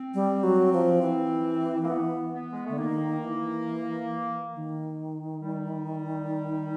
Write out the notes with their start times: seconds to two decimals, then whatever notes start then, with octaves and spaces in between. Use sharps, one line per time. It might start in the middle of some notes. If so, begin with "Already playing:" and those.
Already playing: C4
0.14 G3
0.43 F#3
0.73 F3
1.02 E3
1.83 A#3
1.89 B3
2.34 B3
2.52 G#3
2.65 D3 A3
2.78 D#3 A#3
3.22 E3
4.54 D#3
5.41 G3